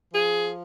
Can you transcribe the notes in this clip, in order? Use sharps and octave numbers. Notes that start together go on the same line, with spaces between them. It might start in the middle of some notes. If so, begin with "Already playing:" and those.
F3 G#4